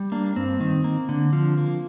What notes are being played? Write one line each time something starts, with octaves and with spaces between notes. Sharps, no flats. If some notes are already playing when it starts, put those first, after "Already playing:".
Already playing: G3
A#3 D4
G2 C4
D#3
A#3
D3
F3
A#3